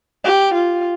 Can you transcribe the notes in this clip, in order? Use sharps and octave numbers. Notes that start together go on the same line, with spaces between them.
G4
F4